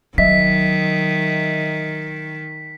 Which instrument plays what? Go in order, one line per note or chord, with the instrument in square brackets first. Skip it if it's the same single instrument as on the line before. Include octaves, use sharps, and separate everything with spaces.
[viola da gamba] D#3 [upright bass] F#3 [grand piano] D#5 E5 [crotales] B6